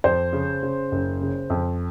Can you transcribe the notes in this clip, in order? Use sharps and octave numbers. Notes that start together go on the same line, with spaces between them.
F2 C5
C#3
C#3
F#1
C#3
F2